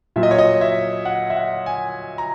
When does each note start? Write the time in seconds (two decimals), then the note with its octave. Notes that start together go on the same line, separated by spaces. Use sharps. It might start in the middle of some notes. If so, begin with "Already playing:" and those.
0.16 A#2 F#3 E5
0.23 D#5
0.31 C#5
0.38 D#5
0.61 E5
1.05 F#5
1.30 E5
1.36 F#5
1.66 G#5
2.18 A#5